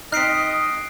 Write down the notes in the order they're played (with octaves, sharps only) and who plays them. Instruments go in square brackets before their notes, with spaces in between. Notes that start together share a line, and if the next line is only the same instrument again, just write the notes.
[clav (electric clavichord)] C4 D#4 [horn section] D#5 [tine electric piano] F6 B6 [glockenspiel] F#6 C7 D7